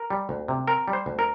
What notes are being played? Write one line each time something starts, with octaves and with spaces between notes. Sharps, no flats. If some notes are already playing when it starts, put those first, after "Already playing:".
Already playing: A#4
G3
D2
C3
C4 A#4
G3
C5
D2
A#4